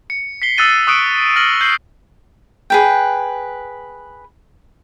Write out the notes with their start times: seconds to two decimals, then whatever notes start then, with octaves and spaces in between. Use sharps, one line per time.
0.10 C#7
0.42 B6 C7 G7
0.57 D#6 E6 F#6 A6 D#7 G7
0.87 C#6 D#6 F#6 C#7 D7
1.36 F6 A#6 F#7
1.61 G6 C7 F#7
2.70 G#4 B4 G5